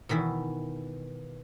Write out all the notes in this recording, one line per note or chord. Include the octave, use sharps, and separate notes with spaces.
B2 D#3 E3 E4